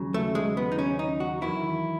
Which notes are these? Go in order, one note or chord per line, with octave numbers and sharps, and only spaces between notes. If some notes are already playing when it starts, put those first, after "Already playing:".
Already playing: D#2 C#3 F#3
A3
G#3
B3
D#4
C#4
D#4
F#4
E2 D#3 F#3 E4